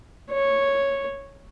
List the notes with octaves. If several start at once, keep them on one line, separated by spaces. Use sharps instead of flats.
C#5